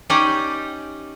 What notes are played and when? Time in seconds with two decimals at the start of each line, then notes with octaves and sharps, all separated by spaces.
0.10 C#4 D#4 G4 D5 D#5